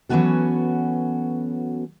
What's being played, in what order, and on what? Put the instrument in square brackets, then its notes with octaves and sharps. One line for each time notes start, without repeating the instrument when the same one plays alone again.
[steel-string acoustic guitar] E3 F#3 B3 C#4 F#4 A4